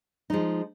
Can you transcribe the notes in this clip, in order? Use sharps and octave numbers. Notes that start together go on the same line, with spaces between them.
F3 G#3 D#4